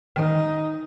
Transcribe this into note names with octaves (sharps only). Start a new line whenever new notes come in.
D#3 D#4